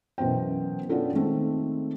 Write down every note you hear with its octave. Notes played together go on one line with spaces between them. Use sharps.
F#2 B2 E3 C5 G5
B3 C#4 D4 F4 A4
D#3 G#3 A3 C4